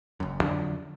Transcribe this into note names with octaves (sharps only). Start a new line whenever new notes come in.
F#1 F#2
F2 D3 F#3 D4